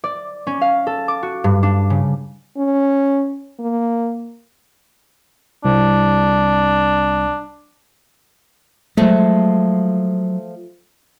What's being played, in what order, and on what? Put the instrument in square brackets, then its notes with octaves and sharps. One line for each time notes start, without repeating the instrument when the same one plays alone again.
[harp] D5
C#4
F5
A4
D6
F#4
G2
D4
C#3
[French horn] C#4
A#3
[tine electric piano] C2 [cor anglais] D4
[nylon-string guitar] F3 A3 [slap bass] F#3 G#3